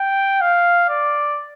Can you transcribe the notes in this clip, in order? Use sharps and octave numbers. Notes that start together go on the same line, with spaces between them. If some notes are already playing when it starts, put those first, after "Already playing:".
Already playing: G5
F5
D5